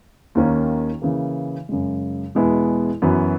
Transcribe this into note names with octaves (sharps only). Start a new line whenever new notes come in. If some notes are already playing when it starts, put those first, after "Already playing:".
D#2 D#3 A#3 C#4
C#3 E3 A#3
F#2 C#3 G#3
E2 B2 G#3 B3 E4
F#2 E3 B3 F#4